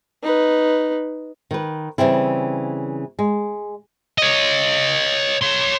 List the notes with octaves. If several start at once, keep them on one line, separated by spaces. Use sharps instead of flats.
D#4 B4
D#3 B4
C#3 E3 G3 C4 E4
G#3
C#5 D#5
C#5 C6